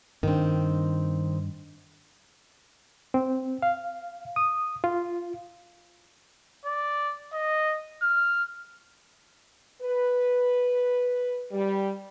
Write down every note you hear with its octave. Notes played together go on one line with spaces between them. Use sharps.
G2 D#3 C4 D4
C4
F5
D#6
F4
D5
D#5
F6
B4
G3